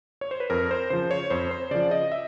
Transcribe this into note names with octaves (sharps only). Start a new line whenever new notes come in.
C#5
C5
B4
F2 A#4
C5
C#3 F3 C5
C#5
F2 C5
C5
C#3 F3 D5
D#5
E5